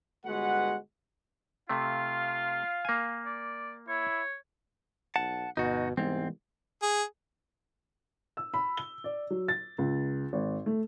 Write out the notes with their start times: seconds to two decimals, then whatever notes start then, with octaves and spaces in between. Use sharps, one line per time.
0.25 G1 G#3 F#4 B4 F#5
1.69 C3 A3 F4 F5
2.85 A#3 G#5
3.25 D5
3.88 E4 C#5
5.16 B1 F#5 A5
5.57 G1 B2 D#4 F#4
5.97 C2 G#2 E3 G#3 B3 C4
6.82 G#4
8.37 E6
8.54 B5
8.77 G7
9.04 D5
9.30 F#3
9.48 A6
9.78 C#2
10.33 G#1
10.66 A3